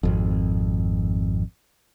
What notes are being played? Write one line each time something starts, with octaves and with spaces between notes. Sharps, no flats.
G#1 F2